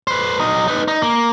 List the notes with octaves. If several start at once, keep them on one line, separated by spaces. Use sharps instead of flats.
B4 C5
F#3 D#5
D#4 B4
D#4
A#3